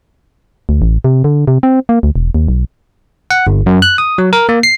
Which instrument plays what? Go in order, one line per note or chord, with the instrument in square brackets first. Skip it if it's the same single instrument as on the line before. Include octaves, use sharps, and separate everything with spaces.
[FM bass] D2
A1
C3
D3
C3
C4
A#3
D2
E1
D#2
B1
[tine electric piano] F#5
G1
F#2
F#6
D#6
F#3
A#4
A#3
C7